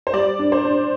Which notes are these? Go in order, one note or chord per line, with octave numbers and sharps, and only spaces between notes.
C5
G3 D5
D4
C5
D4